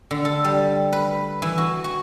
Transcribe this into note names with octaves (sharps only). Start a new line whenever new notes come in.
D3
A4
G3
B4
E3
F#4
F#4